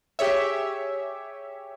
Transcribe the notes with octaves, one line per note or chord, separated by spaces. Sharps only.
G4 G#4 C#5 E5